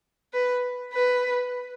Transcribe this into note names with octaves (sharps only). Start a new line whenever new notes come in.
B4
B4